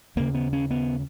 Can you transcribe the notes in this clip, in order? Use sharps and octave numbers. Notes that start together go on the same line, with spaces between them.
D#2 C#3 A#3
B3
C#4
B3